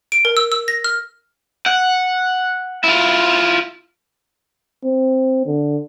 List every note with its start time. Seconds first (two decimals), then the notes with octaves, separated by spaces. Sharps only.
0.12 D7
0.25 A#4
0.37 E6
0.52 E6
0.68 A#6
0.84 F6
1.66 F#5
2.84 E4 F4
4.85 C4
5.46 D3